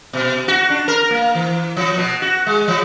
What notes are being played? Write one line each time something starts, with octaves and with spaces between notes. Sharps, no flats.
B2
F#4
D4
A#4
A#3
E3
F3
B2
F#4
G#3
F3